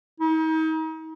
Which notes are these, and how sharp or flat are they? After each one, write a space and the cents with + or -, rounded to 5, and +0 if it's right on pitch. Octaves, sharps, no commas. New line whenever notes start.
D#4 +40